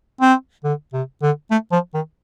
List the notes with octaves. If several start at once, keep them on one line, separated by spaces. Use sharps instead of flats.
C4
D3
C3
D3
A3
F3
D#3